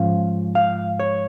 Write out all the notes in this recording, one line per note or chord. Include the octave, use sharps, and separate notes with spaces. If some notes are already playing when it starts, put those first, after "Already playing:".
Already playing: G#2 F3 C#4 F5
F5
C#5